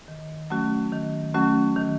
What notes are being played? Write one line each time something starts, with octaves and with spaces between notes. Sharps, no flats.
D#3
F#3 A3 C#4 F#4
D#3
F#3 A3 C#4 F#4
D#3